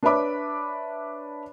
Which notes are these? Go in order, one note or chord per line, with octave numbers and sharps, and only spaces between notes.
D4 B4 C#5 E5 B5 D6